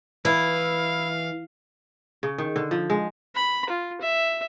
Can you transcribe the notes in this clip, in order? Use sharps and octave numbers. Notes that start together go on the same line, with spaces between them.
E3 E4 F5
C#3
D#3
D3
F3
G#3
B5
F4
E5